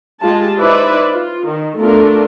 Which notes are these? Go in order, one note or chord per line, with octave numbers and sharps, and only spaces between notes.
G#3 F4 G4 A5
D#4 E4 B4 C5 D5 E5
F4
D#3
A3 B3 D4 F4 A4 A#4